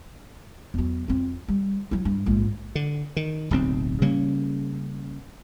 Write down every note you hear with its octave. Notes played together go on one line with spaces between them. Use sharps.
E2 F#3
F2 C4
G3
F#3 E4
G2
A#1 G#2
D3
D#3
D1 B1 C4
C#3 G3 A#3 C#4